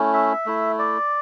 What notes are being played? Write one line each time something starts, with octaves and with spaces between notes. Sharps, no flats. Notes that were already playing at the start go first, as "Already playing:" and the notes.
Already playing: A3 C#4 E4
E5
A3 E4
D5